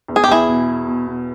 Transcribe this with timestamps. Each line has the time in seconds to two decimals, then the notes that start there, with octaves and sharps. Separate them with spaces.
0.08 E2
0.16 G#4
0.24 G4
0.28 E2 E4 G#4
0.48 B2
0.67 B2
0.87 B2
1.06 B2